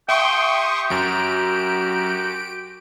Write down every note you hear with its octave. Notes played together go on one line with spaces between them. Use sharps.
G4 E5 G5 C6 C#6 D#6
F#2 F#3 F#4 D7